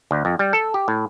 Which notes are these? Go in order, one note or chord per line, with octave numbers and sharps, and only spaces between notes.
D2
F2
G3
A4
G4
A2